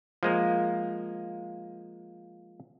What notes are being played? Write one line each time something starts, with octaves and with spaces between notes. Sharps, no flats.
F3 G#3 A#3